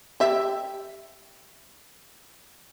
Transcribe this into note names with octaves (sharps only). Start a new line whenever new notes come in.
G4 E5